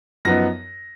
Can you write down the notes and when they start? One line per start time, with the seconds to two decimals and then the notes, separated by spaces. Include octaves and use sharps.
0.25 F#2 F3 B3 D#4 A#6